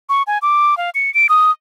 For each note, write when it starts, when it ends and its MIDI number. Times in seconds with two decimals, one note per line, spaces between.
0.09 0.23 85
0.27 0.38 80
0.42 0.77 86
0.77 0.90 77
0.95 1.13 97
1.14 1.27 98
1.29 1.51 87